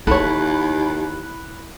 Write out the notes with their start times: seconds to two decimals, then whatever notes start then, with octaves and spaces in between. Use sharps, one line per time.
0.07 D#2 E4 A4 C#5 B5 F#6